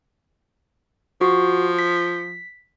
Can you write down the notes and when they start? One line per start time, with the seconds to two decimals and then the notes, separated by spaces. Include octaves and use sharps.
1.21 F3 F#4
1.79 B6